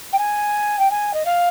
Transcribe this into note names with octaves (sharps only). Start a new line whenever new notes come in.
G5
G#5
G5
G#5
D#5
F5